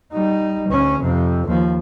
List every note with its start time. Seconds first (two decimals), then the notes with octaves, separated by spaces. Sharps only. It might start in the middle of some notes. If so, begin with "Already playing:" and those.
0.13 G3 D#4
0.69 D2 C#4
1.01 F2 C3
1.47 D#2 F3